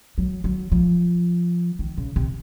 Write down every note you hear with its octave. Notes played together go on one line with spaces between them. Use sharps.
F#3
F#3
F3
D#3
C#3
C3